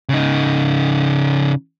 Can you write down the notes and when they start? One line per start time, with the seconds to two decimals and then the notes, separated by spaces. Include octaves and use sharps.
0.10 C#3 D#4